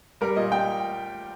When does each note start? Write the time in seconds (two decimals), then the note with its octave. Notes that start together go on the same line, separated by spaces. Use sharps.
0.21 G3 A#4
0.36 A#2 D#5
0.52 A#2 G5